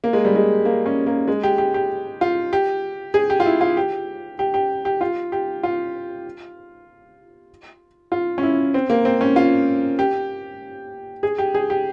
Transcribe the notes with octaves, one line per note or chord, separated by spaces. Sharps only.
A#3
G#3
G3
G#3
A#3
C#4
A#3
G#3
G4
G4
G4
F4
G4
G#4
G4
F4
E4
F4
G4
G4
G4
G4
F4
G4
F4
F4
C#4
E4
C4
A#3
C4
C#4
F4
G4
G#4
G4
G#4
G4